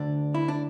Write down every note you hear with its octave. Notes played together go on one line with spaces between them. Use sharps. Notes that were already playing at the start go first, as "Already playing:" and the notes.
Already playing: D2 D3 D4
E4
D4